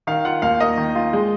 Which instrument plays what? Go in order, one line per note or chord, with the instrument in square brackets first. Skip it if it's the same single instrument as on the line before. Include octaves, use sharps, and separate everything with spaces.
[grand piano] D#3 [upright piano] F5
[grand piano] F4 [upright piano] F#5
[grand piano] D#2 [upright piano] F5
[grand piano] A#3 [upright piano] D#5
[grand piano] D#3
F4
G#3